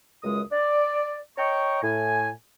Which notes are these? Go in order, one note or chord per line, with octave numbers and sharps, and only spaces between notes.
C#2 F#2 G#3 D#6
D5
C#5 D#5 G5 A#5 C#6
A2 G#5